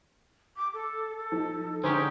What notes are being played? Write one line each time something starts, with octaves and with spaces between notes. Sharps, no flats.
D6
A4
A4
F3 D#4
D3 G#3 C#4 D#4 G4 C5 G5 A#5